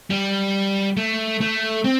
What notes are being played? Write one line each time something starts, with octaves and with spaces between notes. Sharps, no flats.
G3
A3
A3
C4